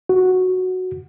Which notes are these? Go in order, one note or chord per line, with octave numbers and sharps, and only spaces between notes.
F#4